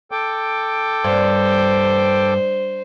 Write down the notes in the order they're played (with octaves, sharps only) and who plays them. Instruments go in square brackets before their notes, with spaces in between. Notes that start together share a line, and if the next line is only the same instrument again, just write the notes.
[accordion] A4 G5 D6
[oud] G2 [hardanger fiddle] C5